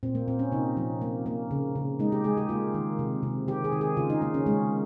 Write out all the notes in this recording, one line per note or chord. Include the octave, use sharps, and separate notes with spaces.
A#2 C4
A#3
A#2 C4
C#4
C3 D#4
F3
A#3
A#3
C#3
C#3
G#3 D#4
G4
G#3 G#4
G4
A#3 F4
D#3
C3
C3
D#3 G4
G#4
D#3
G#4
C#3 F4
D#4
A#3 D#4
C#4
G#3 C#4